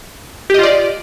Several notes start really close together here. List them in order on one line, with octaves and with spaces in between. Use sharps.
G4 D#5 F4 D5